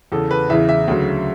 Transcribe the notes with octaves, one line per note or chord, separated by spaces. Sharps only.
E2 C#3 E3 A4
B4
E2 C#3 E3 E5
E5
D2 C#3 F#3